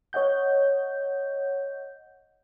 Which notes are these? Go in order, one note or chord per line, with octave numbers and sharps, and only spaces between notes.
C#5 D#5 F#5 G6